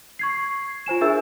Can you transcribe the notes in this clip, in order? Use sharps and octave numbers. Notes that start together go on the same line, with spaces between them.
C#6 G#6 C7
F4 C5 G#5 E7
D4 G#4 A#4 E5 G#5 E6